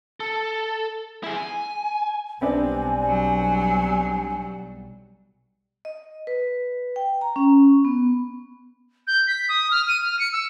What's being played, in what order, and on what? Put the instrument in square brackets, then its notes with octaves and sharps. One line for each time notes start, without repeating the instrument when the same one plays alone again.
[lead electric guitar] A4
E4 G#4
G#5
[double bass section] B1 G3 [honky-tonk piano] B3 C4 D4 [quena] G#5
[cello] F#3
[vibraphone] D#5
B4
G5
A#5
C#4
B3
[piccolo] G6
B6
D#6
F6
D#7
F6
C#7
E6